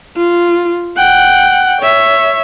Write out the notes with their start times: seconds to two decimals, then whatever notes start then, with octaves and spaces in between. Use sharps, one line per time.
0.16 F4
0.97 F#5 G5
1.81 C#5 E5